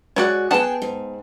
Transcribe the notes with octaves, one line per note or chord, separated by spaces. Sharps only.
G#3 F#4 C#5 D5 F#5
B3 G#4 F#5 G5 A5
G#2